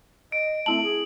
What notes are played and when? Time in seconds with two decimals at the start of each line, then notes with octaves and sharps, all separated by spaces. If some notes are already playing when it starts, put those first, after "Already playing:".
0.32 D#5 D7
0.66 A3 C4 E4 A5 F#7
0.83 G#4